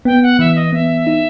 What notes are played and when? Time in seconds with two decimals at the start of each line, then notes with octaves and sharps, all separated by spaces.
0.05 B3 G5
0.22 F#5
0.39 E3 E5
0.56 D#5
0.72 B3 E5
1.07 D#4